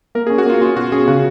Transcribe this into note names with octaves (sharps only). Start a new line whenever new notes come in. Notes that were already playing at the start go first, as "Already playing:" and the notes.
A#3 A#4
G#4
C#4
F#4
A#3 F4
C#4 F4
B2 F#4
C#4 G#4
C#3 F#4